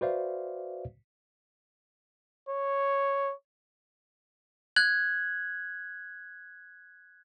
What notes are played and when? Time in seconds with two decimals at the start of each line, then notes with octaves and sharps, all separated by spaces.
0.01 F#4 B4 C5 D5 E5 F5
2.49 C#5
4.76 F#6 G#6 F#7